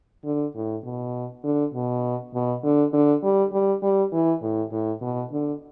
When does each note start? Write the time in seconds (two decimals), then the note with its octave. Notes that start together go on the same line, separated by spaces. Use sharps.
0.25 D3
0.55 A2
0.84 B2
1.44 D3
1.74 B2
2.34 B2
2.63 D3
2.93 D3
3.23 G3
3.52 G3
3.83 G3
4.12 E3
4.42 A2
4.72 A2
5.02 B2
5.32 D3